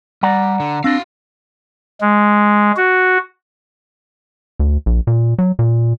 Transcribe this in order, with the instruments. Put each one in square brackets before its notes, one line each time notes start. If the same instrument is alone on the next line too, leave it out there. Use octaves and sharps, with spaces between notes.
[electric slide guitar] G3 [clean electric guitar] D5 F#5 A#5
[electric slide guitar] D3
[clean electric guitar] C4 D4 [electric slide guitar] F#4 F5
[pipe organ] G#3
F#4
[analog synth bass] D2
A#1
A#2
F#3
A#2